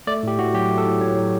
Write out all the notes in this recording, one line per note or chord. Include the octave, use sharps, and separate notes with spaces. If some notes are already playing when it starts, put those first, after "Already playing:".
A3 D5
A2 G4
A2 F#4
F#3 G4
A3
A4
A2
A2 C#5
F#3